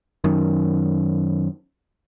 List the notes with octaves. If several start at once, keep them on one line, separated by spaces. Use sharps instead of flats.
F#2 D#3